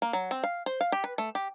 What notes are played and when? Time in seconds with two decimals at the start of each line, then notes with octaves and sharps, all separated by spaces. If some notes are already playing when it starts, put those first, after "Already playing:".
0.02 A#3
0.13 F#3
0.31 C4
0.44 F5
0.66 C5
0.81 F5
0.92 G4
1.04 B4
1.18 A3
1.35 G4